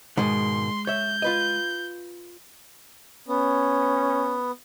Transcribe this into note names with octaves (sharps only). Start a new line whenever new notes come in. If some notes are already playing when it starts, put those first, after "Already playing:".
G#2 B2 D#3 G#3 C6
C#5 E5 G6
F4 B4 D#5
B3 C#4